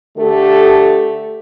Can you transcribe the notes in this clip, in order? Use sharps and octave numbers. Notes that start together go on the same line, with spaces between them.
D3 A3 G4 A4